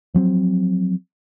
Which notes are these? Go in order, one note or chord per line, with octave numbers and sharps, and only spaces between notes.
F3 F#3 C4